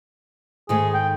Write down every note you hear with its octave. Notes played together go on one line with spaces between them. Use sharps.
G#2 D#3 A3 G#4
G5